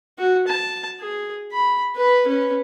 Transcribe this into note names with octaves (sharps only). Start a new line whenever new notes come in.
F#4
A5
G#4
B5
B4 B5
C#4 B4